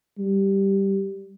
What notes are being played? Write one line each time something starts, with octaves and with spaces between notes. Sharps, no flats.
G3